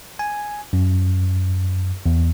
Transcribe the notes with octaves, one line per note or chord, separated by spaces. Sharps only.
G#5
F#2
E2